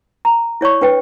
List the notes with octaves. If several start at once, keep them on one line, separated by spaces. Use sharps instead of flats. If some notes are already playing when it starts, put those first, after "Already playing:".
A#5
E4 C#5 D5 C#6
D4 B4 G5